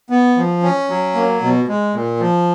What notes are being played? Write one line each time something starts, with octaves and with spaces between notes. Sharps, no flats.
B3
F3
C#4
F#3
A#3
B2
G#3
A#2
F3